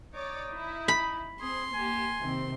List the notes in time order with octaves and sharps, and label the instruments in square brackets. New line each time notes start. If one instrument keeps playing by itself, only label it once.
[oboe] D#4 [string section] C#5 D5 D6
[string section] E4
[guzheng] B5
[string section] C4 [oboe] G#4 [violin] C6
[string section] A#3 G4 [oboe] G#5
[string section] C3 D#3 C4